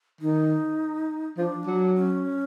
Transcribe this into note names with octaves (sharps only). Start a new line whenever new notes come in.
D#3 D#4
F3 D4
F#3
C#4